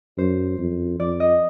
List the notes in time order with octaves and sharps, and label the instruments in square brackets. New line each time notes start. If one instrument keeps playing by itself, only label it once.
[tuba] F#2 [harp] C5
[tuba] F2
[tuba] F2 [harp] D5
[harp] D#5